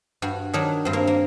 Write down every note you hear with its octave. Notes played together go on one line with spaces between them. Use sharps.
G2 F#4
D#3 F#3 D4
G2 C4
A#3
A#3